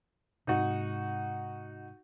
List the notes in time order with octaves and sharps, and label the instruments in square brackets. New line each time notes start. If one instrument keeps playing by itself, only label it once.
[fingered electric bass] G#2 C3 [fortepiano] D#4 F#4